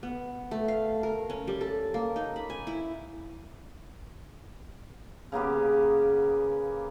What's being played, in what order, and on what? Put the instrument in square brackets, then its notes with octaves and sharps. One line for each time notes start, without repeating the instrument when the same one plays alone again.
[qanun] B3
A3
F5
A#4
C#4
G3
A4
A#3
D#4
B5
G#5
E4
[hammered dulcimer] C#3 A#3 B3 G4